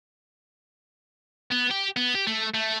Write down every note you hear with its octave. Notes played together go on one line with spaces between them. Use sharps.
B3
G4
B3
G4
A3
A3